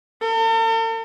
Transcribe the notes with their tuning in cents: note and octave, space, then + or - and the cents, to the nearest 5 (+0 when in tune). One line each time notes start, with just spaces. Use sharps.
A4 +45